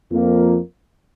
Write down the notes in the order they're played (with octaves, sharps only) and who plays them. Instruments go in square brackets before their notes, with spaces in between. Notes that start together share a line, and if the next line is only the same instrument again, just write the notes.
[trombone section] F2 F3 A#3